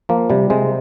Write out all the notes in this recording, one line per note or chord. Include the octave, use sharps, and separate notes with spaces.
F3 A#3
C3 G3
C3 G#3